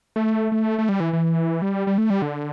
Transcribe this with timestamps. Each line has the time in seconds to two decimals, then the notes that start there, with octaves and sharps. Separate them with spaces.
0.16 A3
0.52 A3
0.78 A3
0.89 G3
1.00 E3
1.13 E3
1.62 G3
1.87 G3
1.98 A3
2.10 G3
2.22 D3